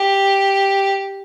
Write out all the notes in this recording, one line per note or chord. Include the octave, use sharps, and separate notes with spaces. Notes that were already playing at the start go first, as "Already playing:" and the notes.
Already playing: G4